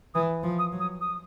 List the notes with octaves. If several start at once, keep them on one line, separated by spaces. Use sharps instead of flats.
E3 D#6
F3
D#6
F#3
D#6
D#6